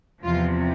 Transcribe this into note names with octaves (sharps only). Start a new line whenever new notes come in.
E2 C3 F3 F4